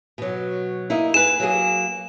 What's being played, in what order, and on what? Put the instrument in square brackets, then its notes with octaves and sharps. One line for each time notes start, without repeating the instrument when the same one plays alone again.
[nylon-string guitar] B2 F#3
A#3 D#4 E4
[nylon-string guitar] G#4 B4 [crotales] E7
[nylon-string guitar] F#3 A#3 G#4